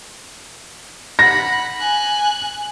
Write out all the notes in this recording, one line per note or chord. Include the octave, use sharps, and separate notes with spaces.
F#5 B5 A#6
G#5 F#6